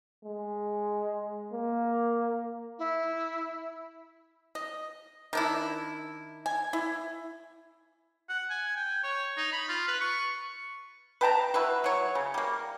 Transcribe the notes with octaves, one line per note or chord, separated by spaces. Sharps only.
G#3
A#3
E4
D#5
D#3 D4 E4
G#5
E4
F#5
G#5
G5
C#5
D#4
B5
F4
B4
C#6
B4 G5 A5 A#5
E4 F#4 B4
F#3 C#5
C#3
G3 A#3